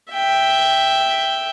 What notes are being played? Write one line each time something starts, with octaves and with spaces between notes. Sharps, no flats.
E5 G5